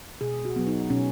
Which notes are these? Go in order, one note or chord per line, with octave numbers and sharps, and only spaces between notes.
B2 G#4
F#4
F#3 B3
D#4
B2 C#4